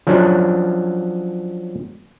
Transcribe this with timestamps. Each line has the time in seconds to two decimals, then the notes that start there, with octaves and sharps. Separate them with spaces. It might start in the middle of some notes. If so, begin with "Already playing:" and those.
0.07 F3 F#3 C#4 D4